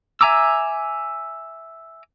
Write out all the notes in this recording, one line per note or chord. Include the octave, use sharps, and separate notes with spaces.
E5 G#5 A#5 D6 E6